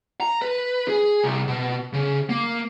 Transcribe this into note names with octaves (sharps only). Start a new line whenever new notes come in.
A#5
B4
G#4
C2
B2
C#3
A#3